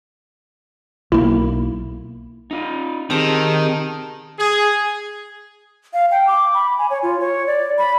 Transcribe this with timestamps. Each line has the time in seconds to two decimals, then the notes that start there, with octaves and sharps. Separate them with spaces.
1.12 B1 A#3 E4
2.51 D#4 F4
3.10 D#3 C4 G4 G#4 A5
4.38 G#4
5.93 F5
6.11 G5
6.27 D6
6.54 B5
6.78 G#5
6.90 C#5
7.03 F4
7.20 C#5
7.47 D5
7.78 B5